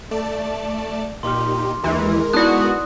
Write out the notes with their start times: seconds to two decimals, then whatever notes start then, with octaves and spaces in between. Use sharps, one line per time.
0.11 A3 D5 A5
1.23 A#2 D#4 G4 C6 D6 F6
1.83 D#2 E3 G#3 A#4
2.33 B3 D#4 E4 F#4 D5 D#6 F#6